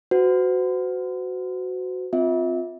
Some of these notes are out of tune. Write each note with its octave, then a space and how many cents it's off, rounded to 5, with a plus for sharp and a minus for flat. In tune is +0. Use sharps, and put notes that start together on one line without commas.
F#4 +0 C5 -45
C4 -10 F4 +15 E5 -35